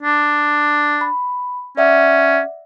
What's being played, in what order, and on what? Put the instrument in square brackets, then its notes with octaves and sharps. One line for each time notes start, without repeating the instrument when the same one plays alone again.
[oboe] D4
[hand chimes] B5
[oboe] C#4 [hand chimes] D5 E5 F#5